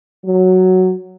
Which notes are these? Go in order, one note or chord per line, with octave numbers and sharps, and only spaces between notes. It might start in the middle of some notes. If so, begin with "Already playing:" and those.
F#3